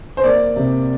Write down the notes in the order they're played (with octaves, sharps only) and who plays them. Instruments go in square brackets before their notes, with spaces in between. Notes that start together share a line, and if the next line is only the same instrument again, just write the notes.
[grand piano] C5
A#3 D5
C3